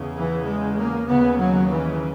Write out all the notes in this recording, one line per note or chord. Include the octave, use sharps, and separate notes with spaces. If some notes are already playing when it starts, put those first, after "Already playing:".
Already playing: E2 C#3
E3
G#3
A#3
D#2 C#3 B3
F#3
E3